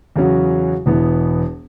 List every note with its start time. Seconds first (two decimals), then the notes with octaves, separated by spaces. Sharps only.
0.16 E2 C#3 F#3 C#4 F#4
0.86 E1 E2 E3 B3